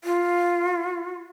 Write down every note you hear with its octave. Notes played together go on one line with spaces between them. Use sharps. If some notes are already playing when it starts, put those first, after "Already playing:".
F4